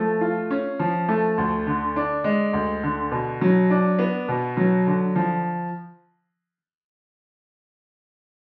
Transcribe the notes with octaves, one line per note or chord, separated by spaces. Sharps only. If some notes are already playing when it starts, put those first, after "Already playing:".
Already playing: F3 A3
F4
C#4
F3
A3
D2
D3
D4
G#3
D2
D3
B2
F#3
D4
B3
B2
F#3
D3
F3